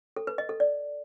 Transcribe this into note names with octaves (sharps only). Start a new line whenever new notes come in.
A4
B4
D#5
A4
D5